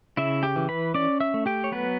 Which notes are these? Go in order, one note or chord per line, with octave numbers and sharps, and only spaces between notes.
C#3 E4 E5
G4 G5
E3
B4 B5
C#4 D5 D6
E5 E6
A3
G4 G5
C#5
F#3 B3 B4